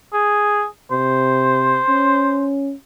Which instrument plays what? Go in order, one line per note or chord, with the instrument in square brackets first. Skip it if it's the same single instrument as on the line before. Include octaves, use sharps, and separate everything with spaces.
[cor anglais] G#4
[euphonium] C3 [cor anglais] C5
[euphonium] C#4